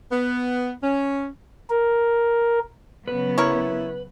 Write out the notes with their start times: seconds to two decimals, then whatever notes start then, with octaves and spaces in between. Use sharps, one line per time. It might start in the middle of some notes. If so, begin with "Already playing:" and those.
0.12 B3
0.83 C#4
1.70 A#4
3.08 C#3 F#3 B3 B4
3.38 E4 A#4 C#5